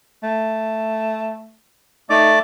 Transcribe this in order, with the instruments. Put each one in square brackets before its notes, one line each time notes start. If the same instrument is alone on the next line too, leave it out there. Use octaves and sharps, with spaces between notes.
[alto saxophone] A3
[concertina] A3 D5 D6 [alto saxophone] D#4